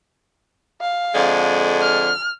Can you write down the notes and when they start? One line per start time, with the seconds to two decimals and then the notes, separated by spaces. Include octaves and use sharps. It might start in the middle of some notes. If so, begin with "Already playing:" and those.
0.81 F5
1.14 F2 D3 G#3
1.81 F6